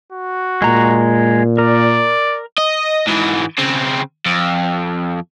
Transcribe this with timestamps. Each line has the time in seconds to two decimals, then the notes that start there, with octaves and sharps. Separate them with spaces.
0.12 F#4
0.62 A#2 G#3 A#5
1.58 A#4 D5
2.58 D#5
3.07 G#2 E3
3.59 C#3 C4
4.26 F2